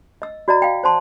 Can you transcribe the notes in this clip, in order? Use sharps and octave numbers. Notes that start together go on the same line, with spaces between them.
D#5 E6
F#4 D5 D#5 A#5
F5 G5
C5 D5 A5 C6